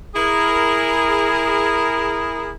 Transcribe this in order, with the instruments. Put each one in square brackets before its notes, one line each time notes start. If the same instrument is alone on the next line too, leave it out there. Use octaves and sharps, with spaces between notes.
[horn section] E4 G#4 A#4